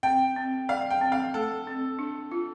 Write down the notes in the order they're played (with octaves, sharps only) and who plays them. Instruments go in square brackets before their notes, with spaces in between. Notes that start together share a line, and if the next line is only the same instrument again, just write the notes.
[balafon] C4 [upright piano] G5
[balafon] C4
[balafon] D5 [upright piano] F5
[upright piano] G5
[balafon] C4
[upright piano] F5
[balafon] A3 [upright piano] A4
[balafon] C4
D4
F4